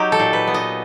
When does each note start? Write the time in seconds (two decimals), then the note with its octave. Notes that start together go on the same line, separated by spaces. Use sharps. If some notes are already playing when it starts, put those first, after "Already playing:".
Already playing: F#3 D#4 G4
0.12 A4
0.19 A#2
0.33 B4
0.47 B3
0.54 D#5